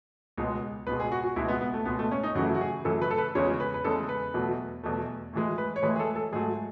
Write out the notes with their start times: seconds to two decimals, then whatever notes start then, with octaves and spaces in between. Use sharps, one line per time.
0.38 C#2 B2 G#3
0.87 C#2 B2 G#3 B4
1.00 G#4
1.12 F#4
1.24 F#4
1.36 C#2 B2 G#3 E4
1.48 B3
1.61 B3
1.74 A3
1.85 C#2 B2 G#3 B3
1.99 A3
2.11 C#4
2.23 D#4
2.35 F#2 C#3 E3 A3 F#4
2.55 F#4
2.61 G#4
2.85 F#2 C#3 E3 A3 A4
3.02 B4
3.11 A4
3.18 B4
3.35 E2 C#3 G#3 C#5
3.60 B4
3.74 B4
3.84 E2 C#3 G#3 A4
4.09 B4
4.34 E2 B2 F#3 A3
4.83 E2 B2 F#3 A3
5.33 A2 E3 G#3
5.58 B4
5.76 C#5
5.83 A2 E3 G#3 B4
5.96 G#4
6.00 A4
6.16 A4
6.33 G#2 F#3 A3 G#4